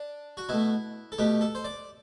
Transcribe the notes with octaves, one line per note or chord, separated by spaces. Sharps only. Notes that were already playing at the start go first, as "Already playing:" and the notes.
Already playing: D4
F#4
B2 A3 E4
A4
B2 A3 G4
A4
C5
D5